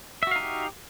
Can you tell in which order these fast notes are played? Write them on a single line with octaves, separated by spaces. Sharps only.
E5 F#4 F5 D#4 G4